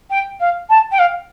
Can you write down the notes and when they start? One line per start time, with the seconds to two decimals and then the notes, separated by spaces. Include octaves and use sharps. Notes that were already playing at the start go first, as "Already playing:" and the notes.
0.10 G5
0.39 F5
0.69 A5
0.91 G5
0.98 F5